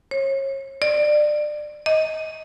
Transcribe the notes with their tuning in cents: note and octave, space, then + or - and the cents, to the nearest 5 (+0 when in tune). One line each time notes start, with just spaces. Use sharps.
C#5 -35
D5 +25
D#5 +20